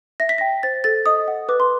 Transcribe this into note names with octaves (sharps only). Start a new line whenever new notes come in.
E5 A#6
B6
G5 A#6
C5 A6
A4 A6
D#5 D#6
F#5
B4 D6
C6